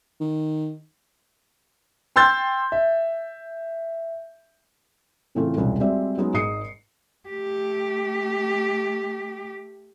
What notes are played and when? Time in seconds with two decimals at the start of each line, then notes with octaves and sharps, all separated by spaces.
0.20 D#3
2.16 G5 C6 E6 G6 A6
2.72 E5
5.35 A2 C#3 E3 A3 C4 F4
5.57 E1 C2 C#4 F4
5.80 G3 G#3 C4 F#4 D5 E5
6.18 F#3 G#3 B3 C#4 D#4
6.33 G#1 G#2 D#5 D#6 C7 C#7
7.29 A3 G4